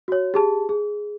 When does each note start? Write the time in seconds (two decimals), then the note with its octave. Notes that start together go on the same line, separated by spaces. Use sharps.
0.08 F#4 C#5
0.34 G4 G#4 A5
0.69 G#4